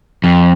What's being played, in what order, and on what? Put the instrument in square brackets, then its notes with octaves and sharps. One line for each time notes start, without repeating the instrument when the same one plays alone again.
[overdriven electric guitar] F2